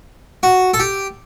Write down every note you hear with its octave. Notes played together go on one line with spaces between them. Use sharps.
F#4
A4
G4